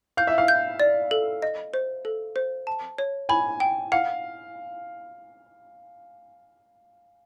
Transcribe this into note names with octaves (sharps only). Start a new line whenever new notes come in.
F5 G6
E5
F5
G6
D5
A4
D#5
C5
A4
C5
A5
C#5
G#5 B5
G5
F5 F#5